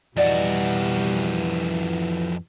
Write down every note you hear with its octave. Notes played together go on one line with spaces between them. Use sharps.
F2 B2 E3 G3 F#4 D5 D#5